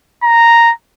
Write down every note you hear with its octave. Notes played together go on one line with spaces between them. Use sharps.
A#5